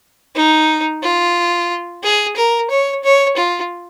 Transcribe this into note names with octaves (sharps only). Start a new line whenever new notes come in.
D#4
F4
G#4
A#4
C#5
C#5
F4